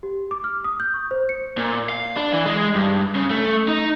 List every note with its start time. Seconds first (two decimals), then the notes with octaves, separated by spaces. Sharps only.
0.03 G4
0.31 D6
0.44 F6
0.64 D#6
0.80 G6
0.94 C#6
1.11 C5
1.29 C#7
1.57 A#2
1.89 F5
2.16 D4
2.33 E3
2.46 G#3
2.75 G2
3.15 C#3
3.30 A3
3.68 D#4